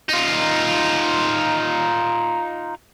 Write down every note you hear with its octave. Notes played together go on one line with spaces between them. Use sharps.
D#4 F4